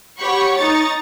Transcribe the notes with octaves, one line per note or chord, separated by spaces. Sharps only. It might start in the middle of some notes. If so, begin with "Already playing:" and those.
G4 C#5 F#5 B5 C#6
D#4 A#5 C#6 A6